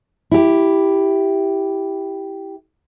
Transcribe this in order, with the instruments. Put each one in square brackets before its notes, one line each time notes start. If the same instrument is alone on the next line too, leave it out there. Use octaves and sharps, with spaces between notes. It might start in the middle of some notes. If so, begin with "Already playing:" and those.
[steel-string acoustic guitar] E4 G4